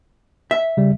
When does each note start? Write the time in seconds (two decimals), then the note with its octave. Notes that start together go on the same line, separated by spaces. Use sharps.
0.51 E5
0.77 C#3 G3